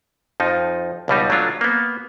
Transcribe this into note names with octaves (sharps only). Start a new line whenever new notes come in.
F2 F3 D#4
C#2 B2 G3 D#4
F#3 A3 D4 F4
A#3 B3